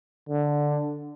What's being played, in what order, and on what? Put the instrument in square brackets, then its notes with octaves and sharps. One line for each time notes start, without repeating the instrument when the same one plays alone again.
[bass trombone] D3